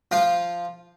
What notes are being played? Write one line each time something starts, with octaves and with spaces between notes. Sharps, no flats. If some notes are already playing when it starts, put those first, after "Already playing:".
F3 F4